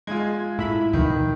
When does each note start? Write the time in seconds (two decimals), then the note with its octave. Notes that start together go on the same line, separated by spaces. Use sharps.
0.07 G#3 F4 G#6
0.59 A2 E4 B5
0.93 D2 B2 D#3 F3